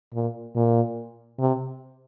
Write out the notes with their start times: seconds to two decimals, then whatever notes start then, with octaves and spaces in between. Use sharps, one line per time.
0.14 A#2
0.55 A#2
1.39 C3